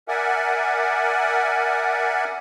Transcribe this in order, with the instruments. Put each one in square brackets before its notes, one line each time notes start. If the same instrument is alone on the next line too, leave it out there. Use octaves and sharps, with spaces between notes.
[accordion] A#4 D5 E5 F#5 G#5